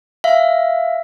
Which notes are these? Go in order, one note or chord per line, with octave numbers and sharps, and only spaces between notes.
E5 F5